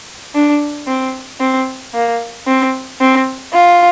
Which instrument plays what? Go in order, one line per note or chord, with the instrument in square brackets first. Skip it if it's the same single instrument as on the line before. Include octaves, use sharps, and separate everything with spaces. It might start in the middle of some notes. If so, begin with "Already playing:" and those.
[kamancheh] D4
C4
C4
A#3
C4
C4
F4